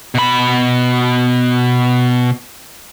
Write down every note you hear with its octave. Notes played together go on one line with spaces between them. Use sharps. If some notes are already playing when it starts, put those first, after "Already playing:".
B2 B5